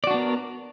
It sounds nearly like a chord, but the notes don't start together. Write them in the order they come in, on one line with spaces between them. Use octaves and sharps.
D5 F#4 D4 B3 A#4